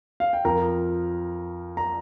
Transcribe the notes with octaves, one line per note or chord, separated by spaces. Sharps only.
F5
G5
F2 F3 A#4 A#5
A#5